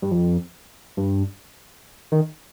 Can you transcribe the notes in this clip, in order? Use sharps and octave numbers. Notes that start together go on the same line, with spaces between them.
G2
F2
G2
D#3